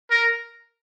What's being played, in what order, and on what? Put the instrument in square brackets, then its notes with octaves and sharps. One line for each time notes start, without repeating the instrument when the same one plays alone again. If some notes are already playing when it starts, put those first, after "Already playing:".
[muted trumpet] A#4